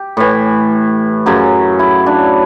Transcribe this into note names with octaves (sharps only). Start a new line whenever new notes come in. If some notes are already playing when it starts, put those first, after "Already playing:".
Already playing: G4
A2 E3
F#2 C#3 F#3
E4
D4